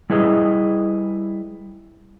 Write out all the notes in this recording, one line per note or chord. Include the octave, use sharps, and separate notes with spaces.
G3 E4 G#4 B4 D#5